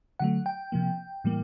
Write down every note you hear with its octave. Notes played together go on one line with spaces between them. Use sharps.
D3 F#3 A3 F#5
G5
C3 F3 A#3
A2 E3 G3 A#3